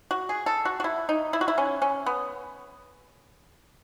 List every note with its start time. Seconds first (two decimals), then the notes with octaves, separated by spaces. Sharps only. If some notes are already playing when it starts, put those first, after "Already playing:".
0.11 F#4
0.29 G#4
0.46 A4
0.65 F#4
0.80 F#4
0.84 E4
1.09 D#4
1.33 E4
1.41 F#4
1.48 E4
1.58 C#4
1.82 C#4
2.06 B3